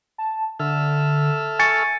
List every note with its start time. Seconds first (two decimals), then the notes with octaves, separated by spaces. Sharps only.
0.18 A5
0.60 D3 A4 E5 F6
1.59 G#5 C#6 A6 C#7